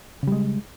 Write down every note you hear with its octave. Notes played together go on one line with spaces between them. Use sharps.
C#3 G3 G#3